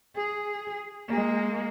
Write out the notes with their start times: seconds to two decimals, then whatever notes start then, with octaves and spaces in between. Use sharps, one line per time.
0.16 G#4
1.08 G#3 A#3